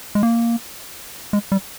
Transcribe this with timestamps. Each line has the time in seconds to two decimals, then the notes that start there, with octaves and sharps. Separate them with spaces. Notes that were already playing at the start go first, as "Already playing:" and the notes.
0.15 G#3
0.23 A#3
1.33 G#3
1.52 G3